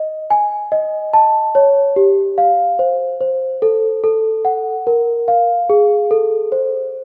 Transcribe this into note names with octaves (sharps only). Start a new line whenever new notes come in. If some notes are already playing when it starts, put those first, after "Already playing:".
Already playing: D#5
G#5
D#5
A5
C#5
G4
F5
C5
C5
A4
A4
F#5
A#4
F5
G#4
A4
C5